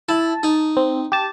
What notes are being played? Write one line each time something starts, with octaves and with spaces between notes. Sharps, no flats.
E4 A5
D#4
C4
G4 A5